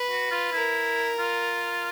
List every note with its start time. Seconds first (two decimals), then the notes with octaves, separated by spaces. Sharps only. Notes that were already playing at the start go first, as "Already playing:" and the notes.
Already playing: B4
0.10 F#4
0.31 F4
0.53 E4 A#4
1.19 F4